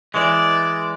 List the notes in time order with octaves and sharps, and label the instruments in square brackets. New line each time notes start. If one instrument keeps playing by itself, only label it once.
[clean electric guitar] E3 G#3 [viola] D5